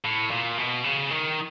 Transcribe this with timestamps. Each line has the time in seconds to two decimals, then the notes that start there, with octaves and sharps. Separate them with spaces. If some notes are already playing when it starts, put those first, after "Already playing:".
0.05 A2
0.31 A#2
0.58 B2
0.84 C#3
1.11 D#3